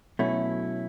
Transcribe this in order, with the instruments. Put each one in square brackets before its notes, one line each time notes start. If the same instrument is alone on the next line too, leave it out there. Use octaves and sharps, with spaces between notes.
[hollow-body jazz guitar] B2 F#3 A3 C#4 E4